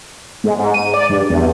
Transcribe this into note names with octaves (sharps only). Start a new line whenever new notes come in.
G#2
G#2
D#7
D5
G2
E2